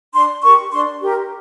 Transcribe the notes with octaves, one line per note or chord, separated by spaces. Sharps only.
D4 C6
G4 A#4 C#6
D4 C6
G4 A#4